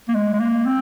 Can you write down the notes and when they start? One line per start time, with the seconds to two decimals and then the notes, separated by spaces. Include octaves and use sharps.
0.08 A#3
0.15 G#3
0.33 G#3
0.40 A#3
0.66 C4